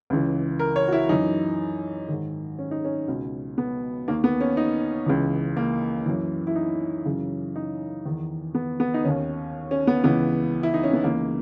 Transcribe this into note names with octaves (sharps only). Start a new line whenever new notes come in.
C#2 C#3 E3
A#4
C#5
F#4
E4
F#2 E3 D#4
G#2 D#3
C#4
D#4
C#4
C#2 B2
B3
D#2 D#3 A#3
B3
C#4
D#4
C#2 C#3 E3
A#3
F#2 E3
E4
D#4
F#2 C#3 E3
D#4
E2 D#3
B3
B3
D#4
D#2 D#3 C#4
C#4
B3
C#2 C#3 E3 B3
E4
D#4
C#4
B3
C#2 C#3 E3 A#3